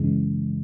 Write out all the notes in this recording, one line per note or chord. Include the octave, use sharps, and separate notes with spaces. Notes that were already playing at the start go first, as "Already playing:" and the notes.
Already playing: F#2 C#3 E3 G#3